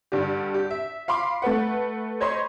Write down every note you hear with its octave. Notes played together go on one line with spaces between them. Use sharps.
G2 D3 D4 G4
G4
E5
F5 B5 C6 D6
A3 A4 B4 F#5
C5 C#5 D#5 B5 C6